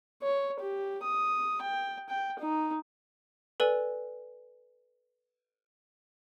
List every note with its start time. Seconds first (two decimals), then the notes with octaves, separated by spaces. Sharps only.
0.23 C#5
0.60 G4
1.03 D#6
1.62 G5
2.09 G5
2.39 D#4
3.60 A4 B4 D5 G#5